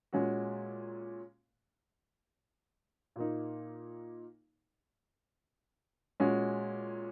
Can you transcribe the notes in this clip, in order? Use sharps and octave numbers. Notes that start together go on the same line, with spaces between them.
A#2 G#3 C#4 F#4
A#2 A#3 D#4
A#2 G#3 C#4 F#4